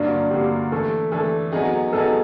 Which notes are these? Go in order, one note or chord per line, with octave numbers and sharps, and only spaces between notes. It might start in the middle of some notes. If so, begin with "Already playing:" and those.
Already playing: G2 D3 F#3 A#3 D4
G2 D3 F#3 A#3 G4
E3 A3 D4 A4
E3 A3 D4 A4
F#3 B3 D#4 G#4
F#3 B3 D#4 G#4 A4